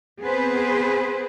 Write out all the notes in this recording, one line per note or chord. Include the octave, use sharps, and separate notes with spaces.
B3 C4 G#4 B4 C5